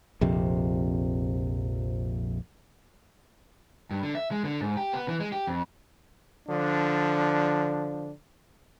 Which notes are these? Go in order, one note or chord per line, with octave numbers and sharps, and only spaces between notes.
A#1 F2 C3
G2
D3
E5
G#3
D3
G#2
G4
B3
E3
G#3
G4
F2
D3 F3 D4